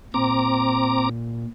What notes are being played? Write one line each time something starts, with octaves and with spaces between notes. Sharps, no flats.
A#2 C4 A#5 D6